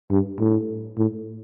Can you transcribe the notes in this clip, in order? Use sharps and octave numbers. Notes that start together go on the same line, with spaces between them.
G2
A2
A2